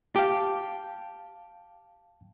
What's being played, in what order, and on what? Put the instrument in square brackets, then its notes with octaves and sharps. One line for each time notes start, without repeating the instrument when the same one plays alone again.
[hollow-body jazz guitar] G4 [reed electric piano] F5 G5 A5